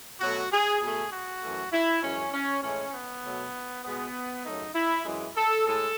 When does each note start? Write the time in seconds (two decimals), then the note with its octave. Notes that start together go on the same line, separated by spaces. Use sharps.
0.20 B2 F#3 A3 F#4
0.51 G#4
0.81 B2 A3 G#4
1.11 F#4
1.42 F#2 E3 A3
1.72 E4
2.02 F#2 E3 G#3 C#4
2.32 C#4
2.63 A2 E3 G#3 C#4
2.94 B3
3.24 B2 F#3 A3
3.84 B2 G#3 B3
4.44 F#2 C#3 F#3 A3 D#4
4.74 E4
5.05 F#2 E3 G#3
5.36 A4
5.66 A2 G#3 A4